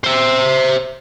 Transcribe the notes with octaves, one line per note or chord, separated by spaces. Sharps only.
C5 E5